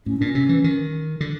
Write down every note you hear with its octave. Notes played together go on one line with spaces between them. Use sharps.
A2 C#4
A#2 D4
C#4
C3
E3
D#3
D3